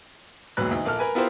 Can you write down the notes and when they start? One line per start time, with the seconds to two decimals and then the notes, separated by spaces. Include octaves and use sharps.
0.57 E1 D#2 G#2 F#3 B4 F#6
0.71 D2 D#4
0.85 A#1 A#3 A4 F6
0.99 A#4 B4 G#5
1.15 B3 E4 F4 G4 A#4 C5